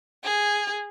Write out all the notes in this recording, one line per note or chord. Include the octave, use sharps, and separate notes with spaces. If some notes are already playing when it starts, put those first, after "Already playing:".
G#4